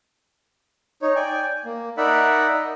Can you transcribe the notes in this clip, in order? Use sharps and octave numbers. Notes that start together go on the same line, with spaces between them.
D#4 C#5
D5 G5 G#5
A#3
D#4 A#4 D5 E5 F#5 B5
D#5